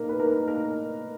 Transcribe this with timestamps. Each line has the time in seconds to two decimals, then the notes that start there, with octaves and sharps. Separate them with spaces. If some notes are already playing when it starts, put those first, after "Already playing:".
Already playing: A#3 D#4 A#4
0.09 B4
0.19 A#3 A#4
0.48 A#3 A#4